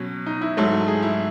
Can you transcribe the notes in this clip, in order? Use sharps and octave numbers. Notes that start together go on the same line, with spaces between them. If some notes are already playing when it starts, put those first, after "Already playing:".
Already playing: B2 F#3 C#4
D#4
E4
G#2 F#3 A3
G#4
E4